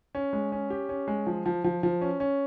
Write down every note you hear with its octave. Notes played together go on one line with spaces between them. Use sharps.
C#4
G#3
C#4
G4
C#4
G#3
F3
F3
F3
F3
C#4
C#4